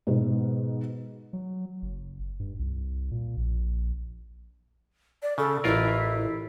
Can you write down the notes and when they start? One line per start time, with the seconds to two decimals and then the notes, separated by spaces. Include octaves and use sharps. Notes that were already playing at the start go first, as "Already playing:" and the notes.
0.07 G#2 B2
1.33 F#3
1.82 F#1
2.40 G2
2.59 C2
3.11 A#2
3.37 A#1
5.22 D5
5.38 C#3 A4
5.64 A1 E4 F4 A#4